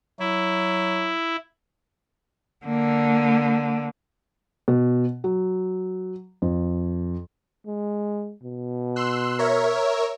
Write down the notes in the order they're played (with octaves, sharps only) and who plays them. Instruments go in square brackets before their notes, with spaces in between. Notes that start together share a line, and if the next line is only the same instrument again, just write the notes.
[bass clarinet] F#3 [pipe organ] E4
[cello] D3 A#3
[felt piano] B2
F#3
F2
[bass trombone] G#3
B2
[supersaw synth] C6 E6 F#6
A#4 C#5 E5